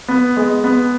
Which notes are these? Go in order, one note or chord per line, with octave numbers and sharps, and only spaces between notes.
B3
G#3
B3